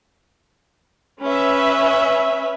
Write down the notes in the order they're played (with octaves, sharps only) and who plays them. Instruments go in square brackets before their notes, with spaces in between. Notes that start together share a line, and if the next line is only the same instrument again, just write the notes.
[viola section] C#4 B4 E5